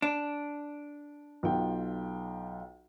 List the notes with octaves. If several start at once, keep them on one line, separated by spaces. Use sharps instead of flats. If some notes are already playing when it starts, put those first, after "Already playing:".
D4
B1 F4 G5